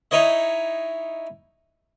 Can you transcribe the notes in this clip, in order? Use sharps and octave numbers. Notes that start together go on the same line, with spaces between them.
D#4 E4 C#5 D#5